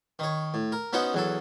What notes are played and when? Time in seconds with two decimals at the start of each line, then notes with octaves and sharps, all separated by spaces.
0.19 D#3 C#5
0.54 A2
0.72 A#4
0.93 B3 C#4 D#4 F#4 C5 F#5
1.14 E2 F#3 A4